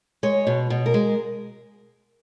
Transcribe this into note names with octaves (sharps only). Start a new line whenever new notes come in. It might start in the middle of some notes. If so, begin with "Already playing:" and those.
G#3 C#5
B2
B2
A#4
G#3